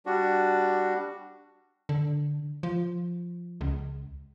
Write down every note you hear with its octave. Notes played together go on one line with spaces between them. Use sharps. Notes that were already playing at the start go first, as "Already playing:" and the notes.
G3 D4 F#4
D3
F3
C#2